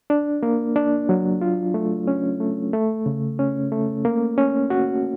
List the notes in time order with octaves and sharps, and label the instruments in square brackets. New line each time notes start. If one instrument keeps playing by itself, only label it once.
[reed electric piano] D4
A#3
D4
F#3
F4
A3
C#4
A3
A3
C#3
C#4
A3
A#3
C#4
F#4